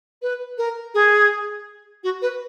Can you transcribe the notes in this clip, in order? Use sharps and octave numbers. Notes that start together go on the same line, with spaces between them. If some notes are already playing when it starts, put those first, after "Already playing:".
B4
A#4
G#4
F#4
B4